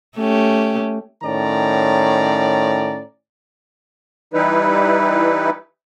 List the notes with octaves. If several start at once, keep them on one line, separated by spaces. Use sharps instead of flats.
A3 C#4 G4
A2 D#3 C#4 D5 A#5
E3 G3 D#4 E4 B4